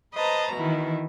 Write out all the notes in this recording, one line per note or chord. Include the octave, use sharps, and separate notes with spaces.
B4 C5 D#5 A5 A#5
B2 D#3 E3 E4